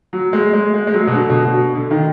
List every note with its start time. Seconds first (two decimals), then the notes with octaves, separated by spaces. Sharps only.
0.13 F#3
0.33 G#3
0.53 G#3
0.74 G#3
0.87 G#3
0.94 F#3
1.07 B2
1.15 D3
1.30 B2
1.45 B2
1.75 D3
1.91 D#3